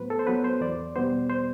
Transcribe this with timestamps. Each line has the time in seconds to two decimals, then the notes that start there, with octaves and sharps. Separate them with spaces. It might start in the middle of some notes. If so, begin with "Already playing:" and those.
Already playing: A2 F#3 B3 B4 C5
0.10 A4
0.19 C5
0.27 F#3 B3 B4
0.44 C5
0.61 E2 D5
0.96 B2 G3 B3 C5
1.29 C5